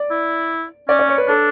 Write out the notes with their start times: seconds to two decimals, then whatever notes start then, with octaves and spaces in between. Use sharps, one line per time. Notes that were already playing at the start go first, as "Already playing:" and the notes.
Already playing: D5
0.11 E4
0.89 C#4 D5
0.99 D5
1.09 C#5
1.18 B4
1.28 D4 A4